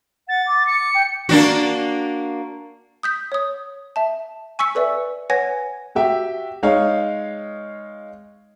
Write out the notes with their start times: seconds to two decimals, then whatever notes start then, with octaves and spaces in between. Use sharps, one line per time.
0.29 F#5 A6
0.47 D6
0.67 C#7
0.94 G5
1.29 A#3 D4 F#4
3.03 D#6 G6 B6
3.32 C#5 D#6
3.96 E5 A5
4.59 G#5 C#6 E6 B6 C#7
4.75 A4 B4 D5 E5
5.30 B4 C#5 F#5 G#5 G#6 A#6
5.95 F#4 G4 E5 G5
6.63 G#3 D#4 C#5 F5